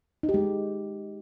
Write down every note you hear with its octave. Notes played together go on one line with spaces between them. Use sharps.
D#4
G4
G#3